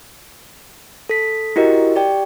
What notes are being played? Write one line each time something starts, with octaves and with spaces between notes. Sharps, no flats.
A4 B6
E4 F#4 G4 A#4 D#5
G4 D5 G5